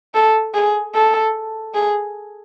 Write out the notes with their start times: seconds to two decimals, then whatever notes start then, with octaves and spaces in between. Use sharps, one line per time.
0.14 A4
0.54 G#4
0.94 A4
1.74 G#4